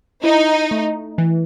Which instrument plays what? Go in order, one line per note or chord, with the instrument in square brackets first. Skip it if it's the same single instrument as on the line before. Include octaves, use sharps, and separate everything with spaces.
[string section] D#4 [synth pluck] E4
[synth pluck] A3
E3